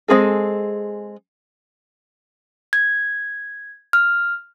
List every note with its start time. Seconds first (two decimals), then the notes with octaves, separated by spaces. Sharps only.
0.08 G#3 A3 C4 G#4 A4
2.73 G#6
3.93 F6